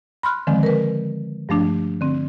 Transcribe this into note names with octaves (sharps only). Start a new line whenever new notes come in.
B5 C6 F6 F#6
D3 D#3 F3 G#3 C4
A#4 B4
G2 F3 A3 D4
D3 C4